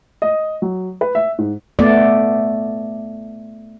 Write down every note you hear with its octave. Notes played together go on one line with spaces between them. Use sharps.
D#5
F#3
B4
E5
G#2
A3 B3 D5